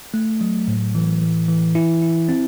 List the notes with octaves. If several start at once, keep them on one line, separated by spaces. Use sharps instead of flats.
A3
F#3
A2
E3
E3
E3
E4
E4
C4